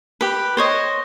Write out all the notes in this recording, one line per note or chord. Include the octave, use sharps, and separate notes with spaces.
G4 B4
C5 C#5 D#5